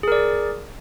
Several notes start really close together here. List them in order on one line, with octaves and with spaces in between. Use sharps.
G#4 A#4 D5